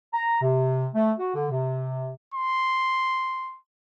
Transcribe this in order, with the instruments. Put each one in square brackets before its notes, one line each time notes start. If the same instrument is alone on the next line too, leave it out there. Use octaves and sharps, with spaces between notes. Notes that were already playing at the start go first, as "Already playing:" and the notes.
[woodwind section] A#5
C3
A3
F#4
D3
C3
[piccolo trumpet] C6